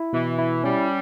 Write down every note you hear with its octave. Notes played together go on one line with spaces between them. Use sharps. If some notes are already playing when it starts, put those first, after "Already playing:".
Already playing: E4
B2 E3
E4
G3 C#4